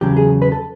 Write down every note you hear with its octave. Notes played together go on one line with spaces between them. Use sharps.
E2 C#3 F#3 G4
G#4
B4
A4